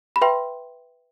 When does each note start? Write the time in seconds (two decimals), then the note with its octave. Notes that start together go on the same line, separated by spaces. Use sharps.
0.16 B5
0.22 B4 E5 G5 C6